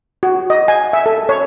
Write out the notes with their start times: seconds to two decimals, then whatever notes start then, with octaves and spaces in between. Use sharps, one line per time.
0.23 F#4
0.50 D#5
0.68 G#5
0.93 E5
1.06 A4
1.29 C#5